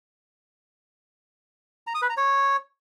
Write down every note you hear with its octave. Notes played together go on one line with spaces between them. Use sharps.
A#5
D#6
B4
A#5
C#5